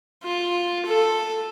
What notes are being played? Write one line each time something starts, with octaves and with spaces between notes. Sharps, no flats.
F4
A4